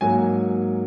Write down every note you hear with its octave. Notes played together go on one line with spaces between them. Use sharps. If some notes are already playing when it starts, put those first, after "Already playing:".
G#2 F#3 A#3 G#5